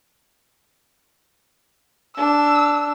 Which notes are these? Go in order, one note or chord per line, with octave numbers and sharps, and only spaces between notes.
D4 E6